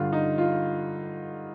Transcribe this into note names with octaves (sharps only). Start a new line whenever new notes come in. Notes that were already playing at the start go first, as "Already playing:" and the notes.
Already playing: G2 D3 F4
D#4
F4